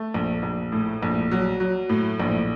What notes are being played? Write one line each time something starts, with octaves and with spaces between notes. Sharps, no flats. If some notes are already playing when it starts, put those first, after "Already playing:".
Already playing: A3
A#1
A#1
A2
A#1
F#3
F#3
A2
A#1